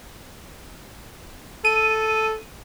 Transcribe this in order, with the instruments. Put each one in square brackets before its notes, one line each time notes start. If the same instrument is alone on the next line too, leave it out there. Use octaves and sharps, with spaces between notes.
[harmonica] A4 [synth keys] D#7